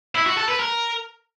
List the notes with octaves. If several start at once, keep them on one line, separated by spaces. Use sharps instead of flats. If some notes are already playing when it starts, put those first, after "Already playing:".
E4
F#4
A4
B4
A#4